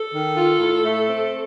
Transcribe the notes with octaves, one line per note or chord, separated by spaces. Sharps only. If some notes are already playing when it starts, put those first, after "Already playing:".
Already playing: A4
D#3
F4
A2
A3
C4